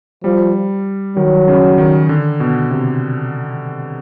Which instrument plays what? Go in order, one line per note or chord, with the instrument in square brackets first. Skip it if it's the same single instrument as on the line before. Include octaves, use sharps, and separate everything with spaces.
[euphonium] F3 [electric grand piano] G3
[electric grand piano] D#3 [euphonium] F#3
[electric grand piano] C#3
D#3
D3
B2
C3